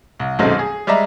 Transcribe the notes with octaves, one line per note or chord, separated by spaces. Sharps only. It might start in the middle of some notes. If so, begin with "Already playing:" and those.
C2
D#1 B1 F#2 G#3 A3 C4
G#4
G3 G#3 D5 E5 A#5